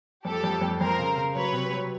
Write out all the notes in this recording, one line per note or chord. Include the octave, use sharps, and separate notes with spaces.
F2 G4 A4
F2
F2
F2 A#4 C5
C#3
C#3
F#3 B4 C#5
C3
F#3